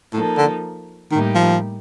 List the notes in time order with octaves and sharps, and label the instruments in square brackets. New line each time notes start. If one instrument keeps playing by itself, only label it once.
[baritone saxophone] A2 [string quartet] F3 A#3 D#4 A4
[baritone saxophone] D3
[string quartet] A2 G3 A#3 D#4 G4 [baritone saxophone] D#3
[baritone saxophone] F3